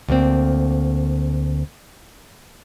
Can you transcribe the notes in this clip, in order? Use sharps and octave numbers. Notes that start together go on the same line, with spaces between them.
D2 A#3 C4